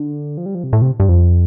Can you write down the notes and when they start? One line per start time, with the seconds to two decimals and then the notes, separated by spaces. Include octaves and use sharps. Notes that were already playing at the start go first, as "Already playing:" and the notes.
Already playing: D3
0.37 F3
0.46 G3
0.55 F3
0.64 C3
0.73 A2
0.82 C3
1.00 G2
1.09 F2